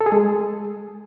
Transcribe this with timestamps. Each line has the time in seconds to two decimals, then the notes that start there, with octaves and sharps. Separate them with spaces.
0.01 A4
0.06 G#4
0.12 G#3